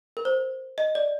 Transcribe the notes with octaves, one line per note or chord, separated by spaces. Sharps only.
A#4
C5
D#5
D5